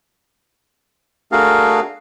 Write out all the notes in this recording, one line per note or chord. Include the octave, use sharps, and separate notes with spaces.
A3 D4 F#4 G#4 A#4 F5